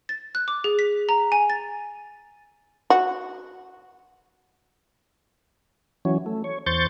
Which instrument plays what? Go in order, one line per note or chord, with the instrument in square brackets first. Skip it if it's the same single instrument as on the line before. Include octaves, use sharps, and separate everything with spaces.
[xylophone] A6
F#6
D6
G#4
B6
A#5
G#5
A6
[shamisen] F#4
[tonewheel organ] E3 F#3 C#4
A3
C#5
E2 C5 C#6 G6 A6